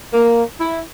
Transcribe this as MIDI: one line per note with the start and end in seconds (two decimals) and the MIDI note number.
0.13 0.44 58
0.59 0.81 64